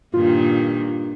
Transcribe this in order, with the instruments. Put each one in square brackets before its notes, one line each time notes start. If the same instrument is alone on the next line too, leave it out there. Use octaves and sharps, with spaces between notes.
[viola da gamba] G2 A#2 D#3 [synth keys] F4